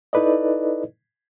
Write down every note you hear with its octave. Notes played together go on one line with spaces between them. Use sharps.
D#4 E4 A4 B4 D5 D#5